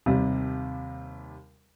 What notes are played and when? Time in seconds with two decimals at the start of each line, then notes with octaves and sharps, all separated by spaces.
0.06 D#2 C3 G3